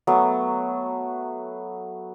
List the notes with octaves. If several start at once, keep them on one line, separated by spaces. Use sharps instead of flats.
F#3 A3 B3